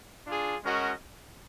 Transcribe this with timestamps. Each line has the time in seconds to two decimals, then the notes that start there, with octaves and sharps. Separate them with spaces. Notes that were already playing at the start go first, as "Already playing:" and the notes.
0.26 D4 F4 G#4
0.62 G#3 C#4 F#4 A#4 D#5